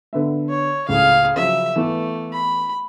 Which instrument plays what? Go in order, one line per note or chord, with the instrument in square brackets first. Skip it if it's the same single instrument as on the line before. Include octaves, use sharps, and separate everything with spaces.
[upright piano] D3 B3 E5
[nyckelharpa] C#5
[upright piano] C#2 A2 C#3 [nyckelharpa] G#4 F5
[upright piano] C#3 F3 F#3 [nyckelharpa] E5
[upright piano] E3 B3 A4 [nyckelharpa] A3
[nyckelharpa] B5